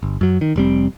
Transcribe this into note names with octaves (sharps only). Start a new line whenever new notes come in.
G1
F#2 F#3
D#3
F1 G3 C4